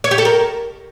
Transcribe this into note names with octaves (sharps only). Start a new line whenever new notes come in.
C#5
G4
A4
A#4